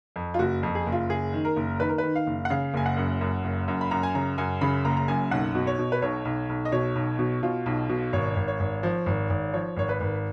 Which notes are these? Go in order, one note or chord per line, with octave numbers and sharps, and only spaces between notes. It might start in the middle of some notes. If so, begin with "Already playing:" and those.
F2
F4
F#1 F#4
F2
G#4
F#1
F4
F#1 G#4
D#3
A#4
F#1
D#3 B4
A#4
B4
D#3
F5
F#1
F#5
C#3 F5
F#1 G#5
F#5
F#2
F#2
F#1
F#2
B5
F#2 A#5
G#5
C#3 A#5
F#2 G#5
C#3 B5
F#1 A#5
A#5
F#2 G#5
B1 F#5
B2
C#5
B2
B4
B1 C#5
B1
B1
D#5
B2 C#5
B1
B2
B2 F4
B1
B2
G#1 C#5
G#1
C#5
G#1
F3
G#1
G#1
F3 C#5
G#1 C#5
B4
G#1